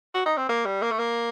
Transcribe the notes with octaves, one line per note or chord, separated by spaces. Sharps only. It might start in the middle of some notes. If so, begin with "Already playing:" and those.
F#4
D#4
C4
A#3
G3
A#3
A3
A#3